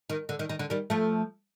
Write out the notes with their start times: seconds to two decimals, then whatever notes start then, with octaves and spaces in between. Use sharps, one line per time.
0.10 D#3
0.29 D3
0.39 D#3
0.49 D#3
0.59 D3
0.70 D#3 G3
0.90 F3 A3